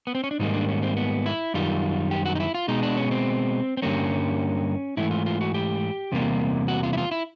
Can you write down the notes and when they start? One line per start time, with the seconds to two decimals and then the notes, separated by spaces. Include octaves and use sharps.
0.07 B3
0.15 C4
0.24 C#4
0.31 D4
0.40 G#2 D#3 G3 A#3 D#4
0.54 D4
0.68 C#4
0.83 C4
0.96 B3
1.26 E4
1.54 F#2 D#3 G3 F4
2.11 G4
2.25 F#4
2.35 D#4
2.40 E4
2.54 F4
2.68 B2 G#3 D#4
2.83 D4
2.97 C#4
3.11 C4
3.77 C4
3.82 G2 D3 G3 A#3 C#4
4.97 G#2 E3 A3 E4
5.11 F4
5.26 F4
5.41 F#4
5.54 G4
6.12 E2 C3 G3 A#3
6.68 F#4
6.83 F4
6.93 E4
6.98 F4
7.11 E4